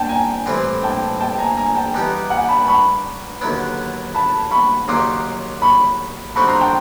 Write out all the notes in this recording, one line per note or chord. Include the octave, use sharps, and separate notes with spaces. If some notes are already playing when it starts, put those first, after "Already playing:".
Already playing: G5 A5
G#5 A#5
A2 E3 G3 C4 E4
G5 A5
G5 A5
G#5 A#5
G#5 A#5
G5 A5
E3 G3 B3 D#4 G4
F#5 G#5
A5 B5
B5 C#6
D#2 D3 F#3 B3 E4
A5 B5
B5 C#6
D#2 C#3 F#3 A#3 D#4 C6 D6
B5 C#6
D3 G3 C4 D#4 F#4 B5 C#6
A#5 C6
G5 A5